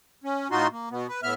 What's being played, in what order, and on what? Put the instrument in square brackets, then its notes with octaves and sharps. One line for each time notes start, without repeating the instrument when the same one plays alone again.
[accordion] C#4
A2 D#4 F4 F#4 C6
A#3
B2 B3
B4
A2 B3 E5 F6